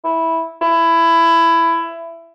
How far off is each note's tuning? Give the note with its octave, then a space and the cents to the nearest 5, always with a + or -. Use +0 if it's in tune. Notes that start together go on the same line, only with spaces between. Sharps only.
E4 -10
E4 +15